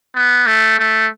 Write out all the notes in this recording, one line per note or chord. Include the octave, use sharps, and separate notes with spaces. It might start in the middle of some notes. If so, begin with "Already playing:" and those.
B3
A3
A3